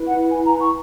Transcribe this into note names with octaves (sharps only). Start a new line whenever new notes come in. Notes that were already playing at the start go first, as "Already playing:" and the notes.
Already playing: E4 B4
F#5
G#5
A#5
C#6